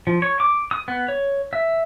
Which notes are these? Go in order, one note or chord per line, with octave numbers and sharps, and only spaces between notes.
F3
C#5
D6
D#6
B3
C#5
E5